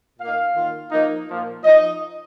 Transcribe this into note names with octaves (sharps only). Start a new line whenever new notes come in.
A#2 A#3 D#4 F5
D#3 A#3 F4
F3 A#3 D#4
A#2 F3 A#3
F3 D#4 D#5